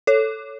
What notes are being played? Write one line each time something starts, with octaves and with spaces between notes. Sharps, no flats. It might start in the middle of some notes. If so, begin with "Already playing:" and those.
A4 C#5